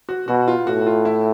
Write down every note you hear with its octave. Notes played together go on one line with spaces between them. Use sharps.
F#4
B2 F#4
F4
A2 F#4
F4
E4